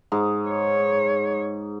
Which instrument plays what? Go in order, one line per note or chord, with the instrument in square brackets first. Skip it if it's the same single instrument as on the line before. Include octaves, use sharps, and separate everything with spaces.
[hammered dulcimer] G#2
[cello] C#5